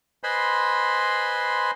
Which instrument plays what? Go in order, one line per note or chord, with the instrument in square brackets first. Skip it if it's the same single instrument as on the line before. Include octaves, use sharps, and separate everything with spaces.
[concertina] B4 C5 D#5 G#5 B5 C6